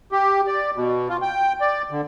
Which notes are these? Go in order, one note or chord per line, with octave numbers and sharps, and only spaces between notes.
G4
D5
B2
F4
G5
D5
D3